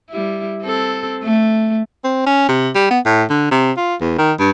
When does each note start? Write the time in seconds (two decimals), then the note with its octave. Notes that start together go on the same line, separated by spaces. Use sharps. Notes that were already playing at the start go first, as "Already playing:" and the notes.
0.10 G3 E4
0.63 C4 A4
1.23 A3
2.04 C4
2.26 C#4
2.48 C3
2.75 G3
2.90 B3
3.05 A2
3.29 D3
3.51 C3
3.77 F4
4.01 E2
4.18 D#3
4.39 G2